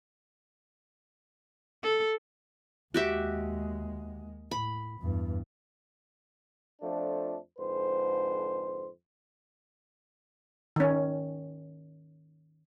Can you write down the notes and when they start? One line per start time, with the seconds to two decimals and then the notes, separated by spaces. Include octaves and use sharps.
1.83 A4
2.94 D#2 G#3 F#4 G4 E5
4.51 A2 B5
5.00 E2 G2
6.80 F2 F3 A3 D4
7.58 F2 G#2 D3 B4 C5
10.76 D#3 C#4